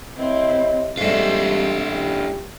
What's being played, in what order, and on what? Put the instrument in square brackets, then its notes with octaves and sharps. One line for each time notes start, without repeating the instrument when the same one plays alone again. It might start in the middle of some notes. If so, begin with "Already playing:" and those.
[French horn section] C3 C#5 D#5 [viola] C4 E4
[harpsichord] G#2 A3 [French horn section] G3 G4 [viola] C4 [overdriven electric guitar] D4 F4
[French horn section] E3 C#4 G4